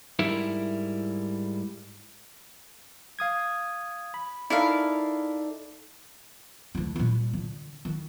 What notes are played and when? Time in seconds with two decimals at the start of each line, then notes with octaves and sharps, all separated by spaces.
0.19 G#2 G3 E4 A#4 E5
3.19 F5 D#6 G#6
4.14 B5
4.50 D#4 E4 A4 A#4 D5 F5
6.75 D2 D3
6.96 A#2 G3
7.33 D3
7.85 D#3